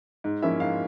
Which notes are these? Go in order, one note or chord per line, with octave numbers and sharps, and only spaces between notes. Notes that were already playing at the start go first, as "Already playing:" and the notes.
G#2
F3 A#3 C#4 E4 E5
G#2 F5